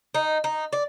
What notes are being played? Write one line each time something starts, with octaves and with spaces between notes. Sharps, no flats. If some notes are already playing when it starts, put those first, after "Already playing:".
D#4
D#4
D5